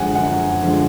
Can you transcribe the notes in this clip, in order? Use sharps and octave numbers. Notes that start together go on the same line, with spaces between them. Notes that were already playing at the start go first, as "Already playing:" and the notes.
Already playing: F#2 D3 F3 G#3 F#5 G#5
F#2 F#5
D3 F3 G#3